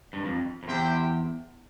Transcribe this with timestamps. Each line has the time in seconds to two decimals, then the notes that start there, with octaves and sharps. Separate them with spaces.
0.13 G2
0.25 F2
0.63 F2
0.68 E2 E4 G4 C5 G5